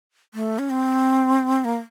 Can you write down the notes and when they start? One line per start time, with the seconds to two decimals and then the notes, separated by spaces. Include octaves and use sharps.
0.34 A3
0.59 C#4
0.70 C4
1.65 A#3